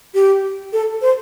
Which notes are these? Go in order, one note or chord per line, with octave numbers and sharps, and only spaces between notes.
G4
A4
C5